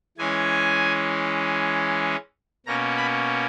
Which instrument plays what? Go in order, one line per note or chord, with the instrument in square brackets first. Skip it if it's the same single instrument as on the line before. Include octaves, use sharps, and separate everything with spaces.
[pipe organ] E3 G#3 C#4 G#5
B2 A#3 C#4 A#5
B5